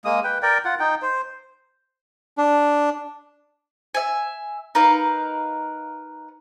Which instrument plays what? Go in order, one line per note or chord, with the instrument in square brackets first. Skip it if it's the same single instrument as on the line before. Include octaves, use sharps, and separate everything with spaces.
[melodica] G#3 A#3 D#6
B4 G5
A#4 D5 G5
F4 F#5
D#4 G5
C5
[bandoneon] D4
[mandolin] E5 G#5
D#4 A#4 B4 F5